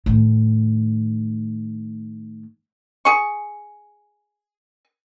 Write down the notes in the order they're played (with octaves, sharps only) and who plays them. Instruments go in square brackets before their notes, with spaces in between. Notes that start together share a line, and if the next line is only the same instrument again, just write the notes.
[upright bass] A2 D#3
[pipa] G#4 C#6